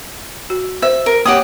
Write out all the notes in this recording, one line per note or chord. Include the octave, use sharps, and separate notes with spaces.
F#4
C5 E5
A#4
A#3 G4 C#5 F#5 D#6